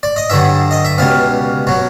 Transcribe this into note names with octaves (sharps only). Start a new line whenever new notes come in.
D5
D#5
G2 D3 F#3 E5
D#5
E5
C#2 B2 G3 F5
B2 F#3